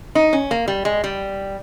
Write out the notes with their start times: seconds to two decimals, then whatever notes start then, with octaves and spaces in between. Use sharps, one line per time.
0.15 D#4
0.33 C#4
0.51 A#3
0.68 G3
0.85 G#3
1.04 G3